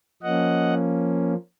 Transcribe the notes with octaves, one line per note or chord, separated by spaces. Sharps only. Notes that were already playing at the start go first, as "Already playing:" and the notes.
F3 A#3 C#4 D#5 F#5